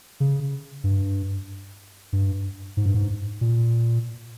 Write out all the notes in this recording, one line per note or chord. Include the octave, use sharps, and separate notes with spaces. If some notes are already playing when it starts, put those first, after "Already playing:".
C#3
G2
G2
G#2
G2
G#2
A#2